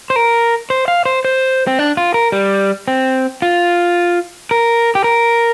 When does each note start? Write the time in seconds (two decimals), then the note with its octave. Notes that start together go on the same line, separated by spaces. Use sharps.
0.10 C5
0.16 A#4
0.70 C5
0.88 F5
1.05 C5
1.25 C5
1.67 C4
1.79 D4
1.97 F4
2.14 A#4
2.32 G3
2.88 C4
3.42 F4
4.51 A#4
4.95 G4
5.04 A#4